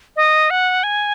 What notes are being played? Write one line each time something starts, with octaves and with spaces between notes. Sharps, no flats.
D#5
F#5
G#5